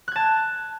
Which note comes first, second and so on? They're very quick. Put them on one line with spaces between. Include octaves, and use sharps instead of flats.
F#6 G#6 A5